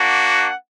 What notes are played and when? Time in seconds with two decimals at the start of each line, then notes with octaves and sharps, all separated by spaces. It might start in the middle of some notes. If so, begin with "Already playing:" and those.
Already playing: A#3 D4 F#4
0.26 F#5